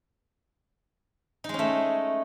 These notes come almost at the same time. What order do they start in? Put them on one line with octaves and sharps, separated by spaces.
D#4 G#3 C#4 A3